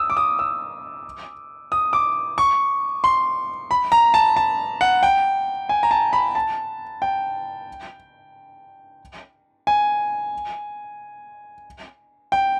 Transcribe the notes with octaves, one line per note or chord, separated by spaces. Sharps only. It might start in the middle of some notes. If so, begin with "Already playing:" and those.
Already playing: D#6 E6
D6
D#6
E6
D#6
D6
C#6
C6
B5
A#5
A5
A5
F#5
G5
G#5
A#5
A5
B5
A5
G5
G#5
G5